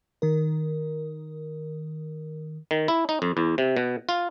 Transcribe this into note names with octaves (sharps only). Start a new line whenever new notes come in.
D#3 A#4
D#3
E4
D#4
F2
E2
C3
B2
F4